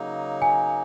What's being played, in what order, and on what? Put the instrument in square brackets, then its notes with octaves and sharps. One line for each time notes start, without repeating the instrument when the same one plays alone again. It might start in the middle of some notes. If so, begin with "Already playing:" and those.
Already playing: [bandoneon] C#3 F#3 A#3 D#4
[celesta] G#5